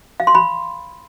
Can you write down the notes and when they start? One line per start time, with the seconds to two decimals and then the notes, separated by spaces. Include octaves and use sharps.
0.20 F5
0.27 C6
0.35 B5